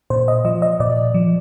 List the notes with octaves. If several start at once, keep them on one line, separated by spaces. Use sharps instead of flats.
A#2 C5
D#5
F3 D#5
D#5
A#2 D5
F3